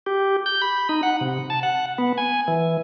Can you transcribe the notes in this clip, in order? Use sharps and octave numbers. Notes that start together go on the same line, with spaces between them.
G4
G6
B5
D#4
F#5
C3
A5
F#5
B3
G#5
E3